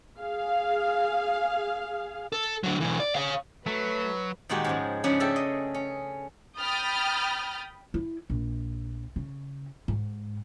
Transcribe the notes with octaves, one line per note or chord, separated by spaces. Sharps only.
G#4 F5
A4
D3 F#3
B1 E3
D5
C#5 F5
F#3 A3 B4
A#2 D#3 G#3 F#4 G4 G#5
G#2 C#3 F3
C#3 F3 C#4 D4 B4
A3 G#4 A4 E5 G5
D#5
C#4
G5 B5 D#6 F6 G6 A6
E4
A#1
C#3
G#2